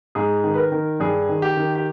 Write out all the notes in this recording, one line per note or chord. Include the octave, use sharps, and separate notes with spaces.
G#2 G#4
D#3
B4
A#4
D#3
G2 G#4
D#3
G4
D#3
G4